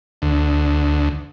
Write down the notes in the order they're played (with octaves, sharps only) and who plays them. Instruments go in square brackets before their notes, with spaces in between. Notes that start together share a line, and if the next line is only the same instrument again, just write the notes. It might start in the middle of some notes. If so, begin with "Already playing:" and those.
[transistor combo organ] D2